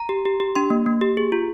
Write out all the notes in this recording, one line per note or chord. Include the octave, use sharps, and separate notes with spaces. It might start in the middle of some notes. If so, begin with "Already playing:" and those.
Already playing: A#5
G4
G4
G4
D4 C6
A#3
A#3
G4
G#4
F4